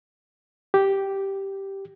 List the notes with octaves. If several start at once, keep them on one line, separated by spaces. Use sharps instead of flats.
G4